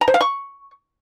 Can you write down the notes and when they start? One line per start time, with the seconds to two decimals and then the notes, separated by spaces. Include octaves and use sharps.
0.01 A#5
0.08 C5
0.14 F5
0.21 C#6